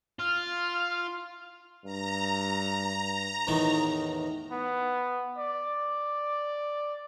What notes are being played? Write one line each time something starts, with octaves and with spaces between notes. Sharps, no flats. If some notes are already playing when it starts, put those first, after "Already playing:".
F4 F6
G2 A#5
E2 A2 D#3 D#4
B3
D5